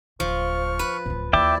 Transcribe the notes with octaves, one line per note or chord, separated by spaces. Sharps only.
D1 F3 C#6 F6
B4
D1 G#1
D#2 E4 D5 E5 G5 D6